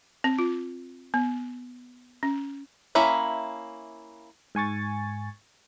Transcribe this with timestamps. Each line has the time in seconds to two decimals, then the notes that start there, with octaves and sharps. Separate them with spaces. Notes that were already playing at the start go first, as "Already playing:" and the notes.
0.24 C4
0.39 F4
1.14 B3
2.23 C#4
2.95 A#3 C#4 E4 E5
4.55 G#2 G#5 C#6 A6